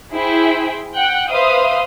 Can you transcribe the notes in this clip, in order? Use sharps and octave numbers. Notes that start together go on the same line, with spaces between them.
E4 G#4 C5 G5
F#5 G5 F#6
B4 C5 E5 F5 C6 D#6